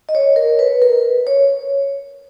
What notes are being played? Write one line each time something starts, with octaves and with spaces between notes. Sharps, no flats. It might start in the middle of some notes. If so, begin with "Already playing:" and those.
D#5
C#5
A#4
B4
A#4
C#5